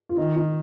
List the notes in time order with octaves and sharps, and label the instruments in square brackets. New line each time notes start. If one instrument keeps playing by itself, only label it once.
[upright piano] F4
[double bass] D#3 [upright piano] D#4
[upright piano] D#4